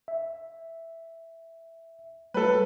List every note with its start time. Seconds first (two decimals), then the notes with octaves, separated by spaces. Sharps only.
0.08 E5
2.34 G3 A3 A4 B4 C#5